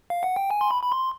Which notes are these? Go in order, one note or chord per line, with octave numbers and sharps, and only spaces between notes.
F5
F#5
G5
G#5
C6
B5
B5
C6